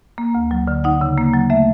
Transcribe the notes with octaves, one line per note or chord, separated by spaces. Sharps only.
A#3
D2
F#3
D3
D#4 F#5
C#3
A#3
F#3
A3 E5